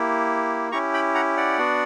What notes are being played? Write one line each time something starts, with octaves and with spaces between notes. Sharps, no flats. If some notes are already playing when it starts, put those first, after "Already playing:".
Already playing: A#3 E4 G4
C#4 E4 G4 A#5 C#6
G5 B5
F#5 A#5
D5 F#5
B3 D4 F#4